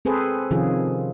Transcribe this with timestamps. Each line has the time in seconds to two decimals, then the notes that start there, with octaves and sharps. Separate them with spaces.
0.05 C4 G#4 A4 B4 C5
0.51 C3 D#3 F3 C#4 F4 G#4